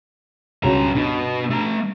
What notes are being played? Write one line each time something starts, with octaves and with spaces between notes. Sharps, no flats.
C#2 G2 F#4 C#5 A#5
G2 B2
A3 A#5